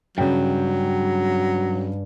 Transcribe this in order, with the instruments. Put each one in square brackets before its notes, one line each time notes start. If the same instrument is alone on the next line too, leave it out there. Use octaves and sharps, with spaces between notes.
[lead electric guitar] G2 [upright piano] C#3 G5 [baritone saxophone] F#3